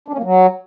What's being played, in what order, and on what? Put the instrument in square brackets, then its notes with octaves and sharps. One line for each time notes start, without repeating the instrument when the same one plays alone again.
[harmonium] D4
C#4
A#3
F#3